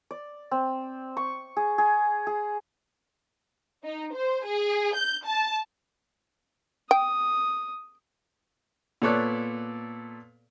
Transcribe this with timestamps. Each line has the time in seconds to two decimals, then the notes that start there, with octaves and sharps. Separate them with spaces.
0.11 D5
0.51 C4
1.17 C#6
1.57 G#4
1.78 G#4
2.27 G#4
3.84 D#4
4.14 C5
4.46 G#4
4.95 G6
5.25 A5
6.91 G5 D#6
9.02 A#2 B3 A4 C#5 D5 F#6